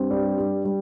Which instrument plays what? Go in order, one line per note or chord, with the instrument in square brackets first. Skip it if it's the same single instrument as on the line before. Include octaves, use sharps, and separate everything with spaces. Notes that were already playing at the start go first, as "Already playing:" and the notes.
Already playing: [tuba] G2 [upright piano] C4
[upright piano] G3
G4
G3